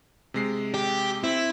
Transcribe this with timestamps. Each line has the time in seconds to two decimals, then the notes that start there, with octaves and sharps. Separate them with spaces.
0.34 C3 G#3 C7
0.74 G4
1.24 C4 E4